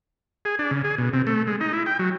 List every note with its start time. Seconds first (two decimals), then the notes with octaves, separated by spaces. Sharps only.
0.45 G#4
0.59 D4
0.71 C#3
0.84 G#4
0.98 B2
1.13 C3
1.27 A3
1.47 G#3
1.61 D#4
1.73 E4
1.86 G5
1.99 F#3